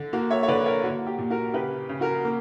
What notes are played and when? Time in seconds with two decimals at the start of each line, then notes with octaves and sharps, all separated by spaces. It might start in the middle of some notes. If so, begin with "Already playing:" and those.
Already playing: D3
0.13 A#3 F#4
0.31 C#5 E5
0.43 C#5
0.48 D3 B4 D5
0.66 A#4 C#5
0.83 A#3 F#4
1.07 G4
1.18 A#2
1.30 F#4 A#4
1.54 C#3 G4 B4
1.89 C#3
2.01 F#4 A#4
2.24 A#3